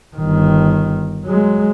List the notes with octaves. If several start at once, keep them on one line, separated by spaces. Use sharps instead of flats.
G1 D#3
F#3 G#3